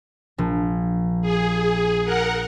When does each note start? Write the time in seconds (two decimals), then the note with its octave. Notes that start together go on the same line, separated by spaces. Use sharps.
0.38 A#1
1.22 G#4
2.05 A#4 F#5